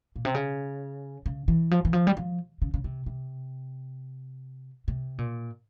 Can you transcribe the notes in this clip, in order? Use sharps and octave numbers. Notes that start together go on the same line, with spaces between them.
A#2
C3
C#3
C#3
E3
F3
E3
F3
G3
F3
C#3
C#3
C3
C3
C3
A#2